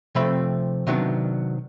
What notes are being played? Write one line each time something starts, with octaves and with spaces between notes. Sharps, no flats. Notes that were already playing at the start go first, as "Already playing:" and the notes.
C3 F3 A3 C4 B5
C3 D#3 F#3 B3 D4